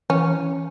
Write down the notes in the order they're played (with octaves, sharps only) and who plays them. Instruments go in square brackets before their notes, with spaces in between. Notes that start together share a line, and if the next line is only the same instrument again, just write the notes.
[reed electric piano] E3 [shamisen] C#4